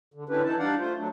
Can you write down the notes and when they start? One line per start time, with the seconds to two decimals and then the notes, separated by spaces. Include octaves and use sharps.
0.14 D3
0.29 D3 C#4 D4 E4 G4 B4
0.43 E3 D#4 E4 A5
0.59 G3 D4 D#4 D5 F5 F#5
0.79 A3 F4 C5
0.97 F#3 A3 D4